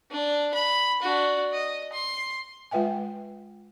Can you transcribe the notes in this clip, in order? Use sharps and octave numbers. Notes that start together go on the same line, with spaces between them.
D4
B5
D4 F#4
D#5
C6
G#3 F4 B4 E5 G5 G#5